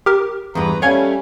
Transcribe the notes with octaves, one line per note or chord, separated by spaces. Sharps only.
G4 A#4
E2 G2 B4 A#5
G3 A3 C#4 C#5 F5 G#5